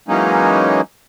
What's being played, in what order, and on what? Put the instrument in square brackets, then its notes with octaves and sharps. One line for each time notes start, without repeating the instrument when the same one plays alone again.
[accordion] E3 F#3 G#3 A#3 C#4 D#4